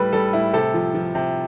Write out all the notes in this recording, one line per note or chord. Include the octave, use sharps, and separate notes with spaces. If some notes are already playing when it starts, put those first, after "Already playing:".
Already playing: A2 G3 A4 B4
G3 A4
A2 E4
C3 A4
F3
F3
C3